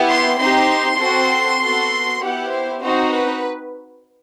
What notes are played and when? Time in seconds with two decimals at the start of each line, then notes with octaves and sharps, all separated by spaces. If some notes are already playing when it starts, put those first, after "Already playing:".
Already playing: B3 E4 G4
0.10 C6
0.40 C4 D#4 G4 C6
1.00 C4 F#4 A4
1.61 B3 F#4 A4
2.21 B3 E4 G4 F#5
2.52 C5
2.81 C4 D#4 F#4 C5
3.12 B4